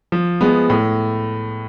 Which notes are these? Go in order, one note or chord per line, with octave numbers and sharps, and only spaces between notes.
F3
G#3 B3
A2